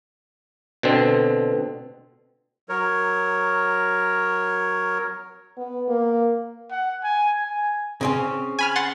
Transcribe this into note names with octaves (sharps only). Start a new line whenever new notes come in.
B2 D3 C4
F#3 A#4 C#5
B3
A#3
F#5
G#5
G#5
C#3 C4 C#4
G#5 B5 F6
F#5 C6 A6